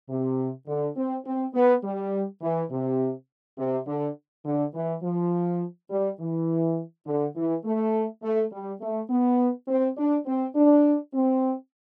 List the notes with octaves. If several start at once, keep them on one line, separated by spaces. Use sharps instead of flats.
C3
D3
C4
C4
B3
G3
E3
C3
C3
D3
D3
E3
F3
G3
E3
D3
E3
A3
A3
G3
A3
B3
C4
D4
C4
D4
C4